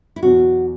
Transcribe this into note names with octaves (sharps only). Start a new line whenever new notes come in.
E4
E2 B2 F#3 F#4